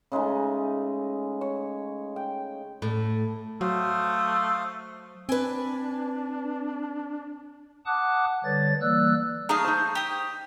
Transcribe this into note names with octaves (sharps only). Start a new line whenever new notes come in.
C#3 G#3 A3 D#4
C#5
G5
A2
F#3 A3 C5 F5 D#6
C4 D4 B4 G#5
F#5 A5 D6 D#6 F#6
D3 G3 B4 C#5 A6
E3 G3 A#3 D5 E6 F#6
A3 D#4 G#4 F5 A#5
D#4 C5
G4 D#6